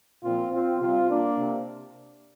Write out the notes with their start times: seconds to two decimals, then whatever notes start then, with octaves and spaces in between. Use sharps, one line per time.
0.24 A#2 F3 C4 F4
0.53 C4 F4
0.81 C3 G3 C4 F4
1.09 A#3 D4
1.37 C3